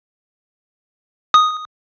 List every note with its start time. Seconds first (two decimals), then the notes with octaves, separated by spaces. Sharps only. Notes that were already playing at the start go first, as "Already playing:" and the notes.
1.34 D#6